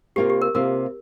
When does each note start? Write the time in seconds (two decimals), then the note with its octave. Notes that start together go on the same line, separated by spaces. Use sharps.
0.16 C3 A#3 F4 G4
0.30 G4
0.42 A#4
0.55 C3 A#3 F4 A#4